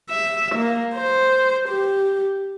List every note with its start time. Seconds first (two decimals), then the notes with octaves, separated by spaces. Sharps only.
0.10 E5
0.55 A#3
0.95 C5
1.69 G4